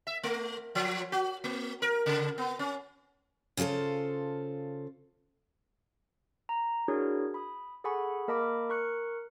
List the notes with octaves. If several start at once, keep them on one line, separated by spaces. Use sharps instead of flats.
E5
A3
F3
F#4
A#3
A#4
C#3
B3
C#4
C#3 F4 F#4 A4 C5
A#5
D4 E4 F#4 G#4 A#4 C#5
B5 D#6
G#4 A4 F#5 G#5 B5 C#6
A#3 A#4 D#5 A5 B5 D6
A#4 C#6 F#6 C#7